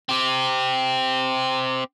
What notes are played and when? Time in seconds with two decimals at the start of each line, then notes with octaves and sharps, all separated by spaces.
0.09 C4 G4